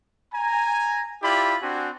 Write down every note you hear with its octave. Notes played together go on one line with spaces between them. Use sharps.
G#5 A#5
E4 F4 G4 D5 B5
C4 D4 F#4 G#5